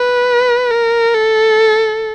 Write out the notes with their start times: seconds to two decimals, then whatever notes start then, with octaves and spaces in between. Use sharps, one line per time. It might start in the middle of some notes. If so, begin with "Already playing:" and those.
Already playing: B4
0.71 A#4
1.15 A4